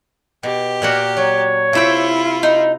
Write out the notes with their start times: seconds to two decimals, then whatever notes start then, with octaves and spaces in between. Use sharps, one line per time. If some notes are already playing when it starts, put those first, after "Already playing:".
0.43 B2 G4
0.82 A#2 A#3 F#4
1.17 F#3 C#5
1.73 C3 E4 F4 E5 G5
2.43 D#4